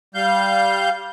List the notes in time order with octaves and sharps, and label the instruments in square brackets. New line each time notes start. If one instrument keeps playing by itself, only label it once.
[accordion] G3 F5 G6